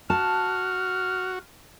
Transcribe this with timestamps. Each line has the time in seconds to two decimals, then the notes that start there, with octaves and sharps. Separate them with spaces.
0.10 F#4 A5 F6